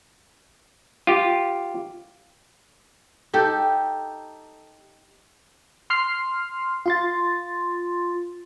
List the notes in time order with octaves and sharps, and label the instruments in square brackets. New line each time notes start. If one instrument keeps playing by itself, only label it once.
[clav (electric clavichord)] F4 G4
[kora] D#4 G4 A4
[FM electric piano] C6 F6 C7
F4 C6 A6